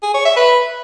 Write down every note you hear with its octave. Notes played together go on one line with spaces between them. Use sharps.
G#4
C#5
E5
B4